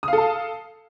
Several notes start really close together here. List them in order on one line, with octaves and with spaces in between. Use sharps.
D#6 F5 A4 A5